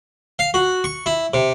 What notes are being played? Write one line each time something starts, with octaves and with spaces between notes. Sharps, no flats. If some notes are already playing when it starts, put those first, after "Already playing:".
F5
F#4
C#6
E4
C3